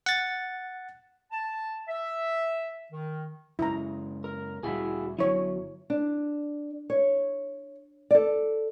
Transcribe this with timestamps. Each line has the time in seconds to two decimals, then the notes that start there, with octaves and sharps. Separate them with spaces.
0.06 F#5 A6
1.32 A5
1.88 E5
2.92 D#3
3.59 F#2 C#3 G#3 E4 A#5
4.24 A#4
4.63 D2 A#2 G3 E4 F#4 G#4
5.19 G1 D3 F#3 E4 C#5
5.90 D4
6.90 C#5
8.11 A4 D5